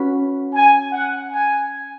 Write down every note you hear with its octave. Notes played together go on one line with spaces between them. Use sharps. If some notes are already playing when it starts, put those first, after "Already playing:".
Already playing: C#4 F#4 B4
G#5
F#5
G#5